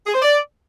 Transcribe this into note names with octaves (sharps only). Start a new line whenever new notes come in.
G#4
C5
D5